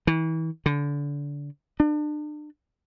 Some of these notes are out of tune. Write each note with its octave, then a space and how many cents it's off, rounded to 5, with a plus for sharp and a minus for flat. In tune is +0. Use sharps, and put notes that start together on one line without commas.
E3 -35
D3 -25
D4 +35